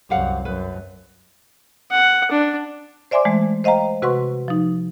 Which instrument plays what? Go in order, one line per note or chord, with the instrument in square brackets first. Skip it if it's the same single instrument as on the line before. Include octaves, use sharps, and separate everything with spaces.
[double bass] C2 F#2 [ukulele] G4 F5 F#5
[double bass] F#2 [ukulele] B4
[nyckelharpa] F#5
D4
[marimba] C5 D5 E5 G#5 C6 D6
E3 G#3 A3
C5 D#5 F5 G5 A#5
C3 F#4 B4 F#5 C6 C#6
F3 D#4